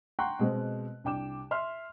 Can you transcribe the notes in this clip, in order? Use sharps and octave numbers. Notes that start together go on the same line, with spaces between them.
F#5 G5 A#5 C6 C#6 F#6
B2 G#3 C4
C2 D4 G5 D6 E7
E5 C6 F6